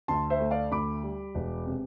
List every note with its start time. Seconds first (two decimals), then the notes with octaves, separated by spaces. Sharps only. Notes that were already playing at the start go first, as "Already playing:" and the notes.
0.08 D2 A5 C6
0.30 C5 E5
0.40 A3
0.51 D5 F5
0.71 D2 B5 D6
1.03 G3
1.35 E1
1.66 C3